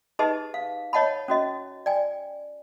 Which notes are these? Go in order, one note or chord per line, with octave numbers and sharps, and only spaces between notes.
D#4 G4 G#4 B4 D#5 A5
F5
C#5 D#5 F#5 A5 B5
C#4 F#4 D#5
D5 G5 G#5